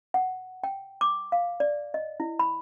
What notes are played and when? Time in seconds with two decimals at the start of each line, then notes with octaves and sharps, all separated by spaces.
0.14 F#5
0.64 G5
1.01 D6
1.32 F5
1.60 D5
1.94 D#5
2.20 E4
2.39 B5